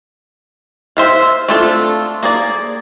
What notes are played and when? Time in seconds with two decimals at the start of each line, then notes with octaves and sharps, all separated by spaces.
0.97 C5 E5 F5
1.48 A3 C4 D4 F4 A4
2.23 A#3 G#4 D5